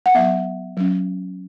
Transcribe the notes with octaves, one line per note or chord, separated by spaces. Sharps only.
F#5
F#3 B3 E5
F#3 C#4